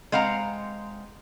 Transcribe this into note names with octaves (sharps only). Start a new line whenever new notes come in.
G#3 C4 F5 F#5 A#5